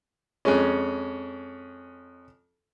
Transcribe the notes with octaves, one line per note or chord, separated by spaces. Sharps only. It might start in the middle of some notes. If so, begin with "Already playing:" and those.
F2 G#3 C#4